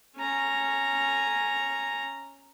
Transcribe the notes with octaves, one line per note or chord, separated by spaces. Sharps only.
C#4 A#5